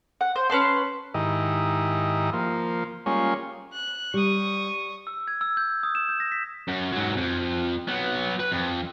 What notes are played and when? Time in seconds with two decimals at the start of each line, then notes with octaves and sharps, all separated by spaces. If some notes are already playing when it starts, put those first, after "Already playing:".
0.21 F#5
0.36 C5
0.50 C#4 B4 A5 C6
1.14 G#2 D#3 E4 G4 D#5
2.33 F3 A#3
3.06 G3 G#3 A#3 C#4 F4 C#5
3.73 F#6
4.14 G3 C#6 D#6
5.07 E6
5.28 G#6
5.41 E6
5.57 G6
5.83 D#6
5.95 E7
6.09 G6
6.20 A#6
6.32 B6
6.68 F#2
6.92 G#2 F#3
7.17 F2
7.88 F#3 B3
8.40 B4
8.52 F2